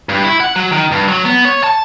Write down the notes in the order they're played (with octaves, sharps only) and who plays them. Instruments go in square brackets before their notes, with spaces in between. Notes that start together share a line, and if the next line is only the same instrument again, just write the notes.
[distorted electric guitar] G2
E4
F#5
F#3
D#3
G2
F#3
B3
C#5
A5